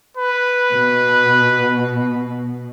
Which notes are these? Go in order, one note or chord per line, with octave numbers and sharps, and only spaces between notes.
B4
B2